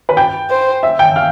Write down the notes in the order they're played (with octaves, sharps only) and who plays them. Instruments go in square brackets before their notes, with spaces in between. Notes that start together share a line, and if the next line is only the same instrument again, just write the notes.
[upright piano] B4 B5
G5 G6
[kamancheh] C5
[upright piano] E5 E6
G5 G6
F5 F6